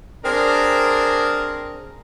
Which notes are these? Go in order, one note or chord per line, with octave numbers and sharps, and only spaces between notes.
C4 D4 G#4 A#4